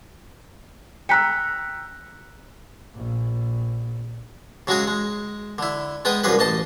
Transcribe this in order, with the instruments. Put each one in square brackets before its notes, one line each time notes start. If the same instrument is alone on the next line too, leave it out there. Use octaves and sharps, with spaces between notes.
[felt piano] G5 A#5 E6 [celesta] F#6 B6 C#7
[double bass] A#1 A#2
[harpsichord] C#3 F#3 G#3 F#4 G#4
G#3
D3 E4
G#3 B3 G5 D#6
C2 F#2 A#3 G#4 B4
A1 D#5 A5 C6